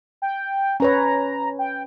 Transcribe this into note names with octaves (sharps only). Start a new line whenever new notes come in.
G5
C#4 B4 C#5 A#5
G5